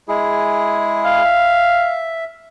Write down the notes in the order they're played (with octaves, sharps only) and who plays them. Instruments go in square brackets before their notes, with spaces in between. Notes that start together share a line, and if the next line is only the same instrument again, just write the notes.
[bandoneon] G#3 E4 G#4
[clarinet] F5
[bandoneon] E5